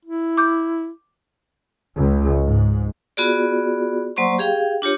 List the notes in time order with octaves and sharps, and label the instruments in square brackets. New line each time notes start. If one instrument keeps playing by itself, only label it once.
[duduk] E4
[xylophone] D6 G6
[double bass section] C#2
G#2
[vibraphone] B3 F4 F#4 G#4 D5
F#3 A#3 C5 D5 C6 C#6
G4 G#4 F5 G5
D4 F4 G4 C#5